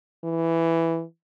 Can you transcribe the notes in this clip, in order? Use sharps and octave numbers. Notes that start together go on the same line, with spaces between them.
E3